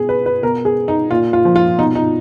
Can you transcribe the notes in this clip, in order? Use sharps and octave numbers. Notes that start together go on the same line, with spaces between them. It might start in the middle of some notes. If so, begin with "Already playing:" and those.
Already playing: B2 G#4
B4
B4
B2 A#4
G#4
D#4
A#2 F4
F4
F3
F4
B2 D#4
D#4